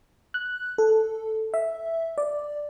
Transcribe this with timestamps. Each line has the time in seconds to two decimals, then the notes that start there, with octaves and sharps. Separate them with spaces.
0.34 F#6
0.78 A4
1.54 E5
2.18 D5